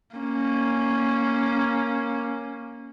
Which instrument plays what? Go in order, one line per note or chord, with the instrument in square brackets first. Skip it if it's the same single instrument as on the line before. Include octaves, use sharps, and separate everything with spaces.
[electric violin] A#3 C#4